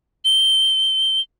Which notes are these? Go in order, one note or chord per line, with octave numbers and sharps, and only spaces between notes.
G7